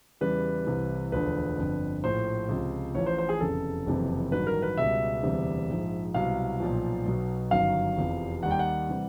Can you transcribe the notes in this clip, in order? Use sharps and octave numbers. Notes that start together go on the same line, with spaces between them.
E2 C#3 E3 G3 B4
C2 C3 E3
E1 D2 D3 F3 B4
G1 F2 D3
A#1 A2 F3 C5
C#2 C3 F3
A1 A2 F3 C#5
C5
C5
G#4
F1 E2 C#3 A4
F#1 F2 C3 E3
A1 G2 D#3 F#3 B4
A#4
B4
C#2 B2 G3 E5
E1 D2 C3 E3 G3
A#1 G#2 F3
C2 B2 F#3 F5
B1 A#2 F3
B1 B2 F#3
G1 F#2 D#3 F#3 F5
F1 E2 C3 F3
D#2 D#3 G3 F#5
G5
F#5
C3 E3 G3